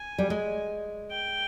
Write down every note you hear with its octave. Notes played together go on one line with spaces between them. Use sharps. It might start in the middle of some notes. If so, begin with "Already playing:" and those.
Already playing: G#5
G3
G#3
G5